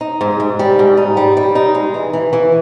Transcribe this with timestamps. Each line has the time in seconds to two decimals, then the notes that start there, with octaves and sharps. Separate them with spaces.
0.01 D#4
0.21 G#2
0.40 G#2
0.59 G3
0.79 G#2
0.97 D#4
1.17 G3
1.37 G3
1.55 D#4
1.75 G#3
1.94 E3
2.13 E3
2.33 E3